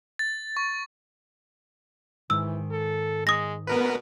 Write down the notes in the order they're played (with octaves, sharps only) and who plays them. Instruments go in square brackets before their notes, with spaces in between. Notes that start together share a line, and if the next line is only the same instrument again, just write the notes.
[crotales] A6
C#6
[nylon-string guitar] G#2 D#3 [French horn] E3 [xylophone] E6
[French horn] A4
[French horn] G#3 [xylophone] D#6 A#6
[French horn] B2 [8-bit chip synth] B3 A#4 B4